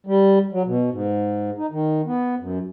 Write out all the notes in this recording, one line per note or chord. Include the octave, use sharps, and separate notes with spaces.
G3
F#3
B2
G#2
D#4
D#3
B3
F#2